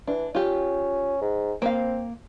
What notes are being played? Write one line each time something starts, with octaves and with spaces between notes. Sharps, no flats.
E3 D4
C#4 F4 G4
G#2
A#3 C4 F5